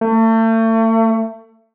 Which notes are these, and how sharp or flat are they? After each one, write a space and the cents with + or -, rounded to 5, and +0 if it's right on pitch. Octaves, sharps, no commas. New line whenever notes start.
A3 +35